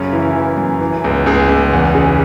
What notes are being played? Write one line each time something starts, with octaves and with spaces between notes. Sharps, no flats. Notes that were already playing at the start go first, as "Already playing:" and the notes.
Already playing: F#2 C#3 C#4
E3 E4
E3
F#2
E3
C#2
C#2 G#4
C#2
E2
C#3